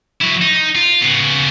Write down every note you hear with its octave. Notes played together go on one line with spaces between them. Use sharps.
F#3 E4
D#4
F4
C#3 B3